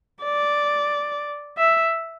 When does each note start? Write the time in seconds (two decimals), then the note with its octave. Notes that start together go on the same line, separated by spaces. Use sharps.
0.23 D5
1.57 E5